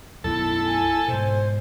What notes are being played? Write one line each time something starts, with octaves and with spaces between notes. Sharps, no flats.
B1 F#2 E4 A4
G#5
G#2 B2 C5